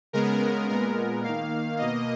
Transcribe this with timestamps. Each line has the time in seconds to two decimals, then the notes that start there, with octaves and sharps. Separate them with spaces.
0.13 C#3 G#3 B3 A#4
0.69 A#2 G#3 B3 A#4
1.24 D#3 A#3 F5
1.78 B2 A#3 D#5